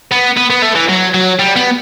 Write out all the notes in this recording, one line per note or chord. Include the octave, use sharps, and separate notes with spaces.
B3
B3
B3
A3
E3
F#3
F#3
G3
B3